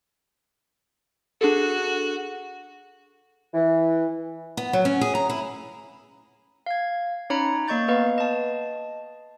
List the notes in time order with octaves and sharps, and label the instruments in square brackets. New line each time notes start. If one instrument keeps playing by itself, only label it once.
[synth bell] D4 G#4 A4 [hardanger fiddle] F#4
[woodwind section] E3
[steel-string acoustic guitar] B3
F#3
C#4
G#4
A#5
E4
[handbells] F5 G#6
C#4 D#4 C#5 A#5 B5 C#7
A#3 D#5 C#6 G6 A6
B3 B4 D#5 F5
D#5 A5